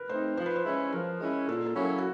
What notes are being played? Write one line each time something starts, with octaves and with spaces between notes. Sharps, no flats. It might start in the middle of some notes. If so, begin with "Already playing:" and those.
Already playing: A#4 B4
A3 C4 D#4 C5
F3 C5
B4
C5
G#3 C#4 E4
F3 A#4
G#3 C#4 E4
A#2 A4
A4
F#3 A#3 C#4 E4
A4
F#4